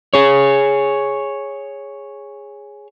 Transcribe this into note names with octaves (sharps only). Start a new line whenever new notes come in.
G#4 C#5